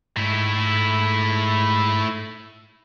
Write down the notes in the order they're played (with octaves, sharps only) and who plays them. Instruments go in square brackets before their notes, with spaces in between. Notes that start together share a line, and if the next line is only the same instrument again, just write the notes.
[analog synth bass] G#2 [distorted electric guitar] A3 E4